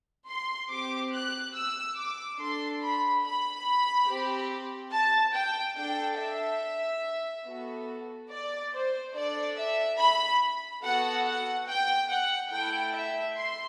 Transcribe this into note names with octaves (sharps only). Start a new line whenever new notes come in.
C6
C4 G4 D6
F#6
E6
D6
D4 A4 C6
B5
B5
C4 G4
A5
G5
D4 A4 G5
E5
B3 F#4 A4
D5
C5
D4 A4 D5
E5
B5
B3 F#4 A4 F#5
F#5
G5
F#5
A3 E4 A4 G5
E5
C6